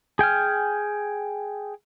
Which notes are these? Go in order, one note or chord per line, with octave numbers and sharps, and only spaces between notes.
G#4 G5 G#5 F6